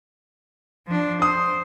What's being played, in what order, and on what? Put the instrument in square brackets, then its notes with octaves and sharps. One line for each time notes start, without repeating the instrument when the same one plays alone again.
[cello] F3 D4
[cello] C5 [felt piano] D#6